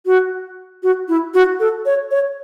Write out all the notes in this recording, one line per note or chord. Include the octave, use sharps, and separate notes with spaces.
F#4
F#4
E4
F#4
A4
C#5
C#5